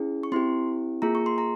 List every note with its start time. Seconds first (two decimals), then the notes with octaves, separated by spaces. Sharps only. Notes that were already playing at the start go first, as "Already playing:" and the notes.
Already playing: C#4 E4 G#4
0.23 C#6
0.32 C4 E4 G4 C6
1.02 A#3 F4 G#4 A#5
1.15 C#6
1.26 C6
1.38 A#5